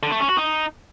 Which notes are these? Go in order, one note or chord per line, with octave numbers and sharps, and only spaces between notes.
D3
A3
C#4
F#4
D#4